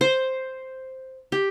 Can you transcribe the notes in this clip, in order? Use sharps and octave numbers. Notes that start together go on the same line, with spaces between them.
C5
G4